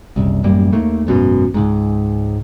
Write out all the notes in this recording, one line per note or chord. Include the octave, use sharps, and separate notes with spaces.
F#1 C2
A1 F#2 G3 A#3
D#2 D#3 A3 A#3
G#1 F#2 B2
C#2 G#2